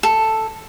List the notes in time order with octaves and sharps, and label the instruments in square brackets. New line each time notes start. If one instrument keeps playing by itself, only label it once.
[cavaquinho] A4